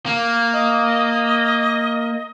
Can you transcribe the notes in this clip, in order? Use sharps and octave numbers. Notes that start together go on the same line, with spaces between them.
A#3
D#5